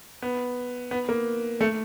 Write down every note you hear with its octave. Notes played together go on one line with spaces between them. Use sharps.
B3
B3
A#3
A3